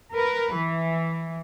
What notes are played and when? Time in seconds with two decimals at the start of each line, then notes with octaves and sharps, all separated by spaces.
0.14 A#4 B4
0.53 E3